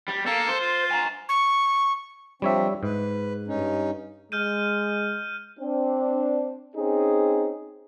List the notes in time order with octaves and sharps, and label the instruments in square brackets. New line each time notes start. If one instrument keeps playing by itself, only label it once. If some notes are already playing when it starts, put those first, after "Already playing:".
[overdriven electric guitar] G3
[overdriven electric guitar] A#3 [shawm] A4
[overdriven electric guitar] C5
[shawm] F4
[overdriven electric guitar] G#5 A#5
[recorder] C#6
[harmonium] F3 C4 D4 [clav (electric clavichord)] G3 C#5 E5
[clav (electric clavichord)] G#2 [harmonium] B4
[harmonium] G2 C#4 D#4
[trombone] G#3 [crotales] F6 G6 D#7
[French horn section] C4 D4
C4 C#4 D#4 G#4